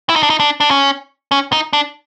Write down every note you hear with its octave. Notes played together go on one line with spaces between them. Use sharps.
E4
D#4
D4
D#4
D4
D4
C#4
C#4
D#4
D4